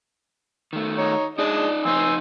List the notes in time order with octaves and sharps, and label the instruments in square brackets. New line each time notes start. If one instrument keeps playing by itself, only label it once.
[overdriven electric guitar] D#3 A3
[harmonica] D#4 C#5
[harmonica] G#3 D4 D#5 [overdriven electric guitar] D#4 D5
[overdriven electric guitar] F2 D#4 [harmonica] C5 G#5 E6